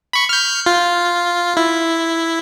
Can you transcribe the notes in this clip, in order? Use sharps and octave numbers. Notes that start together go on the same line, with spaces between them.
B5 C#6
F6 G6
F4
E4